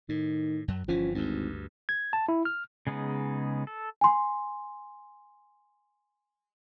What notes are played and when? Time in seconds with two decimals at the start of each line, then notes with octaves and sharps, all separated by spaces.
0.09 A2 D#3
0.68 F#2 F#3
0.88 G1 E3 F3 C#4
1.15 G#1 D2 G2
1.89 G#6
2.13 A5
2.29 E4
2.45 F6
2.87 C#3 G#3 B3 D#4
3.67 A4
4.01 G#5 C6